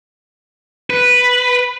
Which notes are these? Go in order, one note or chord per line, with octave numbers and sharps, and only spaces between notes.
B4